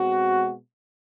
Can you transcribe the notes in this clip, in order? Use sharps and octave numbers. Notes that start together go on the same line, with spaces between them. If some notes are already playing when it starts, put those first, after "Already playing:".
Already playing: B2 G#3 C4 F#4